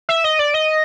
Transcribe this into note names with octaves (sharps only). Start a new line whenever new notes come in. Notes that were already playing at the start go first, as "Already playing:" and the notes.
E5
D#5
D5
D#5